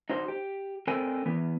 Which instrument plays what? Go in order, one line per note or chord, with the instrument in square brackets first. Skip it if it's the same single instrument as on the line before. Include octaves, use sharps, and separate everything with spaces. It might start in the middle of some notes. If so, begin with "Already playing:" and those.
[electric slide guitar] D#4 F#4 C5
G4
C4 A4 A#4 C5 G5 G#5
E3 B3